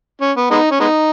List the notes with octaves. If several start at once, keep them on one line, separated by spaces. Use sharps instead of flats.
C#4
B3
G#3 B3 D#4
C#4
G#3 B3 D#4